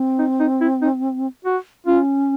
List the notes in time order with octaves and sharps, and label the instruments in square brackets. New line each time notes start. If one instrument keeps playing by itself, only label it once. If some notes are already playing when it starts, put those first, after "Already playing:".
Already playing: [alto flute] C4
[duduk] D#4
D#4
E4
D#4
F#4
[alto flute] C#4 [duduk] F4